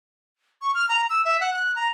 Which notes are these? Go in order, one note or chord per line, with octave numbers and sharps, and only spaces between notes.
C#6
F6
A#5
E6
E5
F#5
F#6
A#5